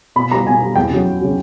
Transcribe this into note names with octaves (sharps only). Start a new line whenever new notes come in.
B2 B5
G3 B3 A#5
B2 G#5
G3 B3
E2 G5
C#3 F#3
E2
C#3 F#3